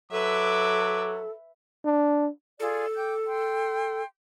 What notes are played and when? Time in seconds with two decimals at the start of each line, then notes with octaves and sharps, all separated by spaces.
0.12 F#3 A4 B4 E5 D6
1.85 D4
2.60 F4 G#4 A4 D5
2.95 G5 D6 G6
3.26 G5 C6